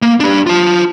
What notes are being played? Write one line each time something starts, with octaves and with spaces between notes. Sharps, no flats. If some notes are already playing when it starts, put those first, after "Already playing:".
A#3
D4 G4
F4 A5